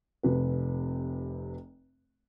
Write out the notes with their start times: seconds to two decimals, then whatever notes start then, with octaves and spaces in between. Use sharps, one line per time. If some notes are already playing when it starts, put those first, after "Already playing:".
0.23 F1 C3 B4